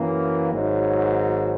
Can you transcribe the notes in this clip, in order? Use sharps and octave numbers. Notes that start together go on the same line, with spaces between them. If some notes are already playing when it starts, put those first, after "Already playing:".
Already playing: F#2 E3 A#3
G#1 G#2 F#3